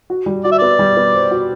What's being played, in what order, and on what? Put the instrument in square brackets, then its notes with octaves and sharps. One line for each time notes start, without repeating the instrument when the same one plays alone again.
[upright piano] F#4
G3
[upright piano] F#4 [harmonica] D5
[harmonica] E5
[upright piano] B3 [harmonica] D5
[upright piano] G3
B3
C5
F#4